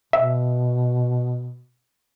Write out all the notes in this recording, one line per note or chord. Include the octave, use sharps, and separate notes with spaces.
B2 E5